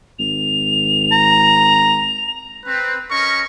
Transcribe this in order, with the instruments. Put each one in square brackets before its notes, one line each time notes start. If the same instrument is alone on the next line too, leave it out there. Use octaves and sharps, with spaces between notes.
[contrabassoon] G#1 [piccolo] F7
[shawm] A#5
[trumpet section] C4 B4
C#4 A#4 D#5 C#6